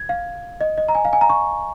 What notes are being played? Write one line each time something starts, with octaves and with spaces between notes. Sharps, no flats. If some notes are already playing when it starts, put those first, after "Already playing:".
Already playing: G#6
F5
D#5
D#5
A#5
G#5
F5
G#5
A#5
C#6